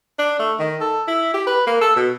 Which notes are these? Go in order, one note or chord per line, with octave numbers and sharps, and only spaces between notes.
D4
A3
D#3
A4
E4
G4
B4
A#3
A4
B2